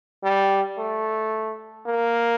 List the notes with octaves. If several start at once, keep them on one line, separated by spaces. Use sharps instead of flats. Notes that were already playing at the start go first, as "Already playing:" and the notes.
G3
A3
A#3